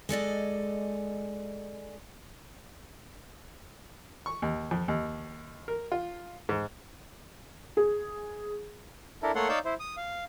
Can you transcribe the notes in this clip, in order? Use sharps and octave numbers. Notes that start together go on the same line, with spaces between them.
G#3 A4 D5 D#5
C#6
D#2
F2
D#2
A#4
F4
G#2
G#4
D4 E4 A4 A#4
A3 A#3 A4 C#5 F#5 C6
D#4 C#5 D5 F5 E6 G6
E4 C5
D#6
F5